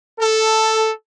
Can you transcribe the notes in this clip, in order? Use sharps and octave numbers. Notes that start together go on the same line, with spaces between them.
A4